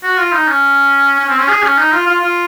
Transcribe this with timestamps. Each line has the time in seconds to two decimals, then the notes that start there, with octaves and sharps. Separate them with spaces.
0.03 F#4
0.18 F4
0.32 D#4
0.47 C#4
1.19 C#4
1.29 C4
1.39 C#4
1.49 G#4
1.63 C#4
1.77 D#4
1.92 F4
2.07 F4
2.21 F4